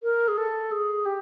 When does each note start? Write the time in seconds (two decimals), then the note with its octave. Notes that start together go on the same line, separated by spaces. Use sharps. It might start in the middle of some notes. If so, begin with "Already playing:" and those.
0.03 A#4
0.28 G#4
0.38 A4
0.72 G#4
1.06 G4